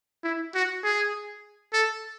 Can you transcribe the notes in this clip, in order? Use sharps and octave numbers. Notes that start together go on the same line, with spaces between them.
E4
F#4
G#4
A4